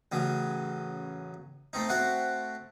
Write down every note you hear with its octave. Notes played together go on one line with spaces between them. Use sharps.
A1 C#3 F#3
A3 C4 D#4
A3 C4 F#4 F#5